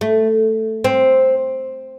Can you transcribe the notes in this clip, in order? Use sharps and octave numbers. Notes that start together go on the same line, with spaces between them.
A3
C4